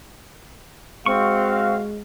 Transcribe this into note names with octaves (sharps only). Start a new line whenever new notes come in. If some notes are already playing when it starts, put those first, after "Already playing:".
G#3 C4 F#4 F5 C#6